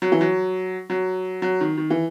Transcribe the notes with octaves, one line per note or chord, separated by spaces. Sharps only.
F#3
E3
F#3
F#3
F#3
D#3
D#3
E3